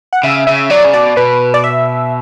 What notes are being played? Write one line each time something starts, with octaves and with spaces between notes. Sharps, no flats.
F#5
C#3 E5
C#3 E5
F#3 D5
C#3
B2 D5
B2 B4
D5
E5